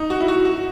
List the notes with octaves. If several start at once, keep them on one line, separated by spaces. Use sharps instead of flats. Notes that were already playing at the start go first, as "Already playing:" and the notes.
Already playing: D#4
F#4
E4
F#4
F#4